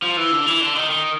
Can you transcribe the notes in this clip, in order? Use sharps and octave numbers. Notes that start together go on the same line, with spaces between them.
F3
E3
D3
E3
D3
D#3
D#3